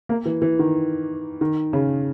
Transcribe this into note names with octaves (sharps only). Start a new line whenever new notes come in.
A#3
E3
E3
D#3
D#3
C#3